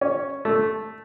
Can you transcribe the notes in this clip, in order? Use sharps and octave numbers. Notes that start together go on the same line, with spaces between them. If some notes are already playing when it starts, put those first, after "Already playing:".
C#4
A3